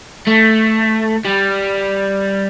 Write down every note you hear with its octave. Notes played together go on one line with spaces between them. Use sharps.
A3
G3